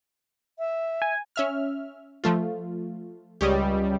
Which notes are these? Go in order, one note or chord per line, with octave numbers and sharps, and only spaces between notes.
E5
G#5
C#4 E5 F6
F3 A3 F4
C#2 G3 G4 C#5 D#5